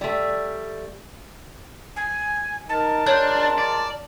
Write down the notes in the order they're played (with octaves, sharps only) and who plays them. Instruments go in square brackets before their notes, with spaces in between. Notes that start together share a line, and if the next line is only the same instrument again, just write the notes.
[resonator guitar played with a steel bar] G3 A3
[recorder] G#5
[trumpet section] D#4 A#4 [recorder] A5
[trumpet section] G#3 F4 A#4 [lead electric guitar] D4 [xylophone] C#5 G6
[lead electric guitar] D5